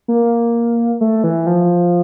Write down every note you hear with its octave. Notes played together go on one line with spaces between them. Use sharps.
A#3
A3
E3
F3